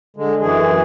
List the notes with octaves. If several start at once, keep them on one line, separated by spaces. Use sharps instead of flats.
D3 G#3
F#2 E3 G#4